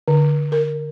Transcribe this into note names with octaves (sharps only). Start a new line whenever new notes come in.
D3
A#4